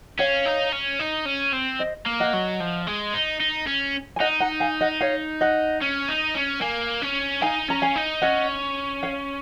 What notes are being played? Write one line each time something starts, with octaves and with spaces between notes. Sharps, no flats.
C#4 C#5 F5
D#4
C#4
D#4
C#4
C4
C5 D#5
A#3
D#5 F#5
F#3
F3
G#3
D#4
D#4
C#4
G#5
D#4 D#5 F#5
F#5 A#5
F5 G#5
D#5 F#5
C#5 F5
D#5 F#5
C#4
D#4
C#4
A#3 F5 G#5
C#4
D#4 F5 G#5
C#4 A#5
F5 G#5
D#4
C#4 D#5 F#5
C#5 F5